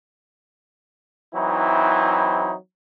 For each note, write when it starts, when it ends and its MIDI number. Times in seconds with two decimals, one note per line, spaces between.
1.33 2.54 52
1.33 2.54 54
1.33 2.54 60
1.33 2.54 63
1.33 2.54 64